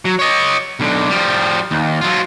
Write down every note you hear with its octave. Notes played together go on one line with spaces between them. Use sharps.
F#3
C#5 D#5
B1 D3
F3 G3
D#2
F#3 F4